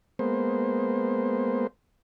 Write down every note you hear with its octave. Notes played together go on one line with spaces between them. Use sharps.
G#3 A#3 B3 C5